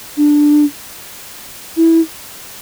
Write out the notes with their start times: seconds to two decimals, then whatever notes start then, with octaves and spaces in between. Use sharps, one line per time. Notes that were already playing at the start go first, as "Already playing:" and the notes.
0.17 D4
1.77 E4